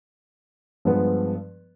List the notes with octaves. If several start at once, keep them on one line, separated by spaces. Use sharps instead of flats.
G2 F3 G#3 B3